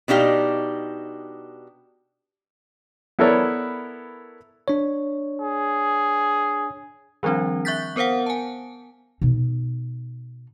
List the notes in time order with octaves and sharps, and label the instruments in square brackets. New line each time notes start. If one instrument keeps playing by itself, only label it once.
[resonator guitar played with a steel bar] B2 D4 D#4 G4 F5
[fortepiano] B3 E4 A4 A#4 C#5 D5
[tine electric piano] D4 C#5
[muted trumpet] G#4
[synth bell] D#3 F3 G3 C4 D4
E5 C#6 F#6 G6 A6 B6
B3 A#4 C5 F5 F#5
G#5 A5
[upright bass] B2 D#4